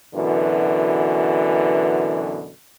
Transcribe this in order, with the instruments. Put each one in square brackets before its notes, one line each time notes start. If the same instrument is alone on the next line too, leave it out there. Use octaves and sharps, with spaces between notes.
[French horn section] F#2 B2 D3 E3